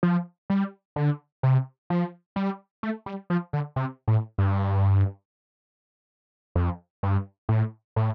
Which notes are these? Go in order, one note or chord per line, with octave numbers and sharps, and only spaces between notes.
F3
G3
D3
C3
F3
G3
A3
G3
F3
D3
C3
A2
G2
F2
G2
A2
A2